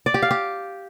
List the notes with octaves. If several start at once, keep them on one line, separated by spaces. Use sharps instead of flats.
D5
G4
F5
G4